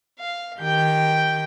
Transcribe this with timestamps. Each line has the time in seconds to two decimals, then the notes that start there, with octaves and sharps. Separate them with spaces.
0.19 F5
0.60 D#3 G4 G5 G6